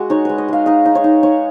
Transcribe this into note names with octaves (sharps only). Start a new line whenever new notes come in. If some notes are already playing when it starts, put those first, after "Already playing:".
Already playing: G#3 F#4
D#4 C#5
G#3 B4
D#5
G#3 F5
D#4 D#5
D#4
C#5
D#4
D#4 C#5